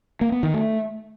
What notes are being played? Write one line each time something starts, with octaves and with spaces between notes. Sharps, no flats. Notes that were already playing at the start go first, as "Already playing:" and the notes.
A#3
B3
D#3
A3